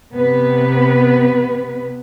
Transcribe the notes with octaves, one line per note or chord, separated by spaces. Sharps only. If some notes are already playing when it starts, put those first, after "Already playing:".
C3 B3 B4